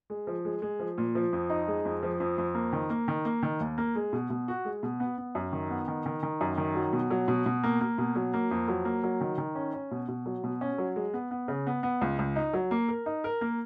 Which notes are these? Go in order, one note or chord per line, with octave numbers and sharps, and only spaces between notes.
G#3
F3
G#3
G#3
F3
A#2
F3
F2
D#4
G#3
F2
F3
F2
F2
A#3
D#3
A#3
D#3
A#3
D#3
D#2
A#3
G#3
B2
B2
F#4
G#3
B2
B3
B3
F#2
D#3
B3
D#3
D#3
D#3
F#2
D#3
F#3
B2
F#3
B2
B2
A#3
A#3
B2
F#3
A#3
F2
F#3
A#3
F#3
D#3
D#3
C#4
C#4
B2
B2
F#3
B2
C#4
F#3
G#3
B3
B3
C#3
B3
B3
C#2
C#2
D#4
F#3
A#3
A#4
D#4
A#4
A#3